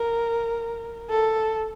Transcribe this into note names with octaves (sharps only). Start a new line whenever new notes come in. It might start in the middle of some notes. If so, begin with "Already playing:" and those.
Already playing: A#4
A4